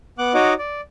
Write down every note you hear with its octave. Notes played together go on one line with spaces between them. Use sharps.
B3 F#5 D6 F#6
D#4 F#4 C#5 D#5 F#5 D6
D5